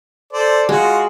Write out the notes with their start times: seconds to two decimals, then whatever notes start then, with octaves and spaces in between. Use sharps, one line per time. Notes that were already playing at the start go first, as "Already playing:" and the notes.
0.33 A4 C5 D5
0.69 G#3 F4 F#4